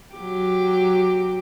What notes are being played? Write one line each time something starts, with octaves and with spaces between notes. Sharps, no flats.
F#3 G4